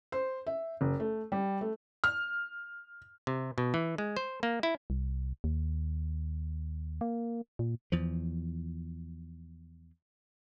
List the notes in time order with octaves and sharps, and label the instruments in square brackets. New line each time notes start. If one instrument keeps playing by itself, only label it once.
[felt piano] C5
E5
F#1
A3
G3
A3
F6
[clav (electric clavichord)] C3
B2
E3
G#3
C5
A#3
E4
[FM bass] C2
D#2
A#3
A#2
[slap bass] E2 F3